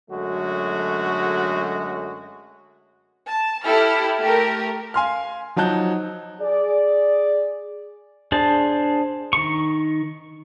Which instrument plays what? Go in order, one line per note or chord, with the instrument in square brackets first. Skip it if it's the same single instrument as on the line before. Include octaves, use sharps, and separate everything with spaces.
[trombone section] F#2 D3 F#3 G#3 A3 F#4
[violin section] A5
E4 G4 A4 F6
A3 G4 A#4
[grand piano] F5 G#5 C6 F6
F3 F#3 D#4 A5 F#6 G6
[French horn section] G#4 D5
[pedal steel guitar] D4 G#4 C5 A5
D#3 C#6